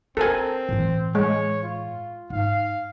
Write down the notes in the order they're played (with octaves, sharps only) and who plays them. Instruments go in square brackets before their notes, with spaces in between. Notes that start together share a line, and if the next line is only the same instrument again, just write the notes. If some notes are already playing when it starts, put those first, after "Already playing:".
[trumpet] C4 [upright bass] F4 [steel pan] A4 A#4 G#5
[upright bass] A2 E3
[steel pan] G#3 [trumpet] C#5
[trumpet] F4
[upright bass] G#2 [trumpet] F5